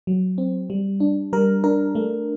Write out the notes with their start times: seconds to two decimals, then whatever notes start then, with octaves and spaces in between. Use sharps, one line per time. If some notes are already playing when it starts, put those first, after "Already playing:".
0.07 F#3
0.38 C4
0.70 G3
1.00 D4
1.33 G3 A#4
1.64 D4 A#4
1.95 A3